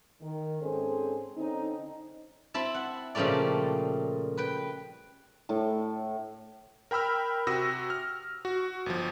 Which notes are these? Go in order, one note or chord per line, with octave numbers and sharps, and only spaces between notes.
D#3
G#2 C4 C#4 G#4 A4 C5
D3 C4 C#4 D#4
C4 E4 E5 A5
F#5
A#2 C#3 F3 G3 A3 D5
B4 G5
A2
A#4 G5 B5 E6 F6
C3 F#4 D#6 E6 A#6
F6
F#4
G1 F3